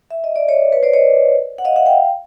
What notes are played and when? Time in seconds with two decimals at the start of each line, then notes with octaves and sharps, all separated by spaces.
0.11 E5
0.24 D#5
0.36 D5
0.48 C#5 D#5
0.72 B4 C#5
0.83 C5 D5
0.93 C#5 D#5
1.58 F#5
1.65 D#5 F5
1.76 E5 F#5
1.86 F5 G5